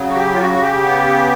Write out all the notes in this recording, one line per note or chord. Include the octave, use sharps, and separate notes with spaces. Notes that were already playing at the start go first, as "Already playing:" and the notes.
Already playing: C#3 F#3
F#4
G4
F4
C#3 F#4
F#4
G4
B3